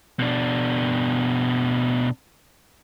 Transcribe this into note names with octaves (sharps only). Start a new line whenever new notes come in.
B2 D4